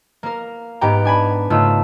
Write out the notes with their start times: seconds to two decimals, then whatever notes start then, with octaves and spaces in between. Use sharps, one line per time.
0.23 A#3 A#4
0.81 G#2 B3 G4 G5 A#5
1.05 D4 G#5 B5
1.50 G#2 C#3 A3 F4 E6